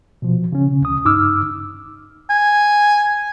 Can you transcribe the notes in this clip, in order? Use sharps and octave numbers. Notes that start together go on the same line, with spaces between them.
B2 F3
C#3 C#4
D2 D#6
G2 D#4 D6 E6 F6
G#5